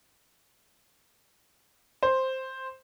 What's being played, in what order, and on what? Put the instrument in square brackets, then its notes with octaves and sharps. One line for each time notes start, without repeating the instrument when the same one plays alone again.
[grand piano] C5